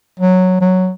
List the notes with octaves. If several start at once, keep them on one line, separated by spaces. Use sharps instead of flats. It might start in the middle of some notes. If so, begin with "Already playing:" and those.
F#3
F#3